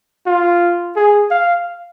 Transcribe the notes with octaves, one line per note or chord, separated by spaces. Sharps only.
F4
G#4
F5